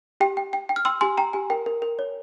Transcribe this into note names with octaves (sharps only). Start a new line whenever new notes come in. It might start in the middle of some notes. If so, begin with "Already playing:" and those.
G4 G5
G5
G5
G5
F6
G5 C6 E6
G4 G#5 C6
G5 A#5
G4 G#5
A#4 G5
A#4
A#4
C#5